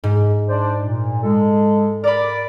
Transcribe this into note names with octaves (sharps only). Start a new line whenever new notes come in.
G#2
D4 C5 D5
A#2
G#3 A4
A#4 D5 B5